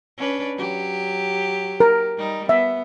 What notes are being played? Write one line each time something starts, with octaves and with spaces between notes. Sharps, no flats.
C#4 D4 B4
F#3 G4
A#4
G3 D#4
B3 E5